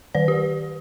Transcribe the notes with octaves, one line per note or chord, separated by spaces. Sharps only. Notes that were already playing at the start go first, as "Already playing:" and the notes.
D#3 D5
G4